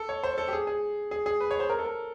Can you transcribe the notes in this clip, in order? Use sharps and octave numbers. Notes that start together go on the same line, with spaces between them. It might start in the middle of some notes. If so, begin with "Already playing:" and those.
Already playing: A4
C#5
C5
A4
G4
G#4
G#4
G#4
G#4
B4
C#5
C5
A#4
A4
A#4